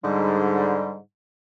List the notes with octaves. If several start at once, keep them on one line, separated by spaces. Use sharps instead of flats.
G#2 D3 G3